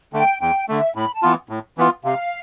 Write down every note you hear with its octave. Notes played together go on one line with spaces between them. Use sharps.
D3 A3 G5
E2 G5
D3 A3 E5
A2 B5
A5
E3 B3 F4
A2
E3 B3 F4
C3 F5